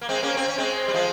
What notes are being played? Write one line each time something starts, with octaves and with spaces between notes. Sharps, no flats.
A#3
G#3 C4
A#3 C#4
C4
C#4
G#3 C4
G3
F3 G#3